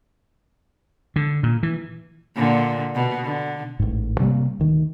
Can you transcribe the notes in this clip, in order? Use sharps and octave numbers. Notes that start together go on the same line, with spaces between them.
D3
A#2
E3
A#2 D3
B2
D3
A1 G#2
C3 G3 G#3 A#3
D2 D#3